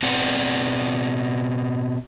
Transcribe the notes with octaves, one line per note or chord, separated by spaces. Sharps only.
B2 C4 G#4 B4 D5 F#5